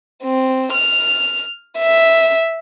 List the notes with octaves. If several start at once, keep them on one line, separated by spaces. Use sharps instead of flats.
C4
F6
E5